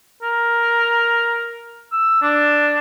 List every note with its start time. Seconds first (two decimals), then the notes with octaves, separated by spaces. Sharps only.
0.22 A#4
1.92 E6
2.22 D4